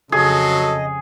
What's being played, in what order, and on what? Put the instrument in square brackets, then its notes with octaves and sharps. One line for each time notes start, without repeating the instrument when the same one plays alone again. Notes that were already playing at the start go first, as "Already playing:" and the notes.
[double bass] F2 C#3 [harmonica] F#3 A4 [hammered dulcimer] G#4 [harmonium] D#5